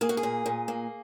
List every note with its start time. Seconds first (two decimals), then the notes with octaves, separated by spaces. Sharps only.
0.01 A#3 G#4
0.09 F#4
0.17 G#4
0.23 A#2
0.46 A#2
0.68 A#3